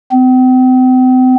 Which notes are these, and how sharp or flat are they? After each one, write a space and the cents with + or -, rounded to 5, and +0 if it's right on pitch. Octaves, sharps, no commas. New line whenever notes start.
C4 -40